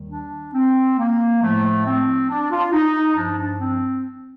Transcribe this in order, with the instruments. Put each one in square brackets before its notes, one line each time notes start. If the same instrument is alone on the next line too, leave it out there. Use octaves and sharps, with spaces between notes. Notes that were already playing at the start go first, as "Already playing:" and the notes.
Already playing: [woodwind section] D#2 D#3 G3
D4
C4
A#3
A2 F3 A3
C4
D4
F4
D#4
G2 F3 D4
D4
C4